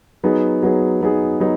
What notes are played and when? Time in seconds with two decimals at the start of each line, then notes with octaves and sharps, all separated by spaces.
0.24 F#3 B3 D#4 G#4
0.62 F#3 B3 D#4 G#4
1.02 F#3 B3 D#4 G#4
1.40 F#3 B3 D#4